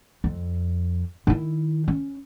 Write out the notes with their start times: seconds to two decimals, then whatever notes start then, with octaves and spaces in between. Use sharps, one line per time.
0.24 F2
1.27 D#3 E4
1.88 C#4